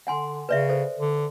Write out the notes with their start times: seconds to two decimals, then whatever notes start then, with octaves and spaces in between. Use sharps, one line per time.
0.07 D3 F#5 G#5 C6
0.49 C#3 B4 D5 E5
0.69 A4 C5
0.99 D3